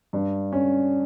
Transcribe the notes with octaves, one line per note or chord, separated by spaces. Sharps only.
G2
C#4